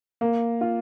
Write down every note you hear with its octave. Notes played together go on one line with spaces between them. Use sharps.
A#3
F4